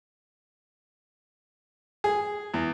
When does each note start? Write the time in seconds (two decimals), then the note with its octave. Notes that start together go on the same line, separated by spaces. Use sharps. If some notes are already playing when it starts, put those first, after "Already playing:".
2.04 G#4
2.54 E2